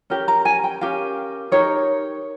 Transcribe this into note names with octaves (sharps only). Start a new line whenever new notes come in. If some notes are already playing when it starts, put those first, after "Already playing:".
C#4 G4 A#4
A#5
G#5
G5
C#4 G4 A#4 F5
D#4 G4 A#4 C#5